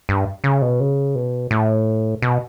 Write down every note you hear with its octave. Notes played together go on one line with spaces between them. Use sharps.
G2
C#3
B2
C#3
B2
A2
B2